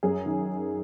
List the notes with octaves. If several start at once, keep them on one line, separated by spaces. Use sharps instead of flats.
F#2 G#4
D#3